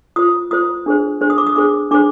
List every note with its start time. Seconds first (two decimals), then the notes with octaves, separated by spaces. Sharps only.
0.16 F4 C5 D#6
0.51 F4 C5 D#6
0.86 D4 G#4 C5
1.21 D4 G#4 C5
1.30 D#6
1.38 D6
1.47 D#6
1.56 D4 G#4 C5 D6
1.91 D4 G#4 C5 D6